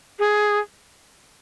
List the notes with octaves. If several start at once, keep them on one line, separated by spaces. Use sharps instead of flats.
G#4